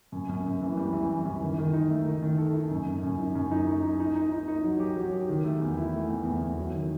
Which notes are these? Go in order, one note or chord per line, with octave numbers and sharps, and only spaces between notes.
F#2
F#2
F#2
E3
G3
E3
E3
F#2
D#3
D#3
D#4
A3
D#3
D#3
A4
D#4
F#2
F#2
F#2
D#4
F#2
D#4
D#4
D#4
D#4
D#4
D#4
D#4
F#3
G4
F#3
G4
D#3
A3
E2
E4
A3
E2
E2
E2
F#3
D#3